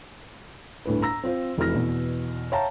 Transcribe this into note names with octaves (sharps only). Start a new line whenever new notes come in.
G1 D2 A2 B4
A#5 E6 A#6
C4 F4 C5
F1 E3 F#4 B4 F6 A#6
E2 B2
C#5 E5 F5 G5 A5 A#5